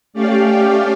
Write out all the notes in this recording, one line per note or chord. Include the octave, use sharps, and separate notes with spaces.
A3 C#4 G4 D5 F5